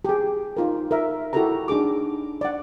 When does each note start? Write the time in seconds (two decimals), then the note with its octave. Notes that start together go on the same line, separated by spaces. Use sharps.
0.05 G4 G#4
0.57 D#4 F4 A#4
0.91 A#4 E5
1.33 E4 F#4 G4 A4 A#4 A#5
1.68 D4 D#4 G#4 D6
2.41 D5 F#5